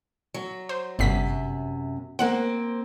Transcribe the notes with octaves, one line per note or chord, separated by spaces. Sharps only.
F#3
C5
G1 F#2 C3 B6
A#3 C4 C5 F#5